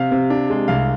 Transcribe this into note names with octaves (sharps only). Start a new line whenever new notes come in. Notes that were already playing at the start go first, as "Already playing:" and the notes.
Already playing: C3 C4 F5
C3
D4
G#3
C2 F5